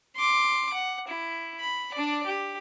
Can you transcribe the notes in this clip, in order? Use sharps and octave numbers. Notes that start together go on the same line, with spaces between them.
C6 D6
F#5
E4
B5
D4 D5
G4